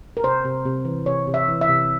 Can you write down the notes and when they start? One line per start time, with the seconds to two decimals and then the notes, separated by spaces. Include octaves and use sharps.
0.17 A#4
0.24 C3 C5
0.45 C3
0.65 C3
0.85 E3
1.06 C3 C#5
1.27 C3
1.34 E5
1.48 E3
1.61 E5
1.69 C3